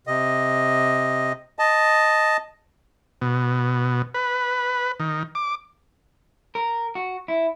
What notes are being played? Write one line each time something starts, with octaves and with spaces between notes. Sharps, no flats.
C3 D#5
D#5 A5
B2
B4
D#3
D6
A#4
F#4
E4